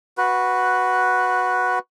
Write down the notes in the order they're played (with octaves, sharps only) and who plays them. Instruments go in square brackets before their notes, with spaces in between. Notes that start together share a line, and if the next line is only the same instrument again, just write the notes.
[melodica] F#4 B4